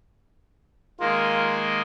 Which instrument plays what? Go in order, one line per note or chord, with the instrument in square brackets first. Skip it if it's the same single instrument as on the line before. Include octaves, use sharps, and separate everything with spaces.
[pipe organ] D#3 G#3 A#3 [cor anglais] F4